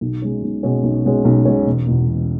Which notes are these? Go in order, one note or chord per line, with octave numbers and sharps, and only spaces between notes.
B1
B2 G#3 C#4
B1
B2 G#3 C#4
B1
B2 G#3 C#4
B1
B2 G#3 C#4
E1
E2 B2
E1